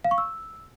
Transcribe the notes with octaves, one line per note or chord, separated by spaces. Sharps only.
F5
C#6
E6